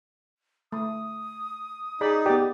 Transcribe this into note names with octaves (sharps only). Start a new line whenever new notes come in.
A3 D#6
D#4 G#4 D5 B5
B3 G4 D5